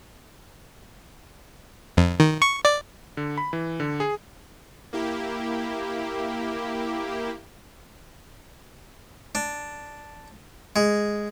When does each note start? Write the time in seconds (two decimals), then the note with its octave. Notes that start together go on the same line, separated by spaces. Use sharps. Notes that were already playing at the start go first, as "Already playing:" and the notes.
1.97 F2
2.20 D#3
2.42 C#6
2.65 D5
3.17 D3
3.38 B5
3.53 E3
3.80 D3
4.00 G#4
4.93 A#3 E4 G4
9.35 D4
10.76 G#3